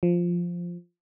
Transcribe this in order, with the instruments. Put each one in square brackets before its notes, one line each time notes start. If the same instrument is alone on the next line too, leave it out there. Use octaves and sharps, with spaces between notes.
[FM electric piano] F3